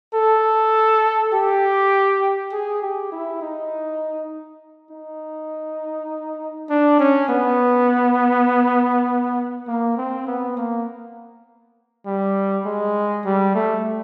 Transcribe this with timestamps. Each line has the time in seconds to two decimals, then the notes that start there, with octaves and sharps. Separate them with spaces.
0.14 A4
1.33 G4
2.53 G#4
2.82 G4
3.12 E4
3.42 D#4
4.91 D#4
6.70 D4
7.00 C#4
7.29 B3
9.68 A#3
9.98 C4
10.27 B3
10.57 A#3
12.06 G3
12.66 G#3
13.25 G3
13.55 A3